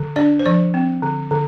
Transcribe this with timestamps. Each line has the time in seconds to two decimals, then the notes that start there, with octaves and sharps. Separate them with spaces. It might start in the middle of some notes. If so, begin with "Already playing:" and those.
Already playing: D3
0.16 D4 D5
0.39 C5
0.46 F3 D5
0.74 C4
1.02 D3
1.31 D3